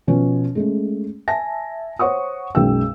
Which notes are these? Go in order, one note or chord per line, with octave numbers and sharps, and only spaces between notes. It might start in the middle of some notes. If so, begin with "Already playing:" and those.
B2 F3 C#4
G#3 A3 C#4
E5 G#5 A5 A#6
C5 C#5 F#5 C#6 D#6
B1 F#2 G#3 G5 E6